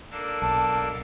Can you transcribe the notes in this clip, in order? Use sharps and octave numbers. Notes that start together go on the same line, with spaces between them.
A#3 D4 A4
B1 A5